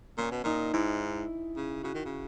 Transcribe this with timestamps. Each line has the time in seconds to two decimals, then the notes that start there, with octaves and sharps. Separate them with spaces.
0.18 A#2 C#4
0.31 B2
0.44 A#2 D#4
0.73 G#2 E4
1.56 C#3
1.83 C#3 F#4
1.95 D#3
2.05 C#3